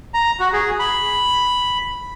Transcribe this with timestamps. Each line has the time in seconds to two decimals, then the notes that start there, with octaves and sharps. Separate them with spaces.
0.14 A#5
0.40 F#4
0.53 G#4
0.79 B5